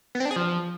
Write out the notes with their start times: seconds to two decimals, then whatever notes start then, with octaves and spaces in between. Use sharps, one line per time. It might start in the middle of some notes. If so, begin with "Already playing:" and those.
0.15 B3
0.20 C4
0.25 D4
0.31 G#4
0.36 F3